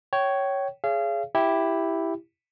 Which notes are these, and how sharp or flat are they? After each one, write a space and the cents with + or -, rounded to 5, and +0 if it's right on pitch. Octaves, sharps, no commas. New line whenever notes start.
C#5 +0 G5 -30
G#4 +10 C#5 +20 F5 -35
E4 +0 G4 +0